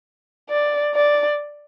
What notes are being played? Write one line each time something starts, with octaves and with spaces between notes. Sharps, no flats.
D5
D5